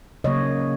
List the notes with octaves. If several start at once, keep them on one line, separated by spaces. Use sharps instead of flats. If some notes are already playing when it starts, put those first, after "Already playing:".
C#3 F#3 A#3 C#5 D#5